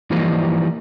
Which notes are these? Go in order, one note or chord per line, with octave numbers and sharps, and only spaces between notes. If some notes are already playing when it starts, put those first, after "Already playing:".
E3 F3 G3 A#3 D#4